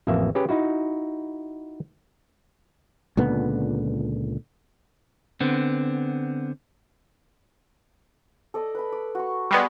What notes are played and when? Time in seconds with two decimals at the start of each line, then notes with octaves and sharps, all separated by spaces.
0.07 A1 F2 A#3 E5
0.35 C#4 G4 G#4 B4
0.49 D#4 E4 F#4
3.17 C#2 A#2 D3 B3
5.40 D3 B3 C4
8.54 A4 D5 D#5
8.75 B4 B5
8.92 D5
9.15 F#4 C#6
9.51 G3 G#3 B3